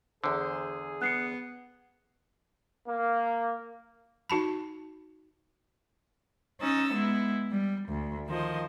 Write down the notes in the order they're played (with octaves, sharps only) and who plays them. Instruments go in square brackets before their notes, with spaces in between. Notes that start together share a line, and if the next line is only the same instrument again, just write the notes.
[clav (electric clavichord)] E2 D3 [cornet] G#4 [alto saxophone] C5
[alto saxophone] B3 [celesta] F#6 C7 C#7
[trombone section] A#3
[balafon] D#4 F#4 A5 B5
[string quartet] C#4 D#4 D#5 E6 A6
G#3 B3 E4
G3
D2
D#3 F3 C5 D#5